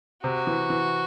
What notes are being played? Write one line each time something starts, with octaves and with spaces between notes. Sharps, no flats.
C3 F#4
E3
E3